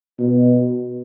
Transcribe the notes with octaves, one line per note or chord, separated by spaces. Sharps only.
B2